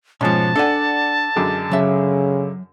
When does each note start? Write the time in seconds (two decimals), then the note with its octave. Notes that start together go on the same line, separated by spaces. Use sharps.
0.21 G#2 B2 F3 C#4 A5
0.56 D4 A4 D5 F#5 G#5
1.36 F#2 D3 G#3
1.71 C#3 F#3 E5